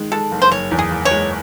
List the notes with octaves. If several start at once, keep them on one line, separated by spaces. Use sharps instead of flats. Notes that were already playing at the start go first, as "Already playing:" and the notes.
Already playing: D#3 G#3
G#3 A4
F#1
C5
F#1 C#5
E2
G#4
F#1
C#5
G#3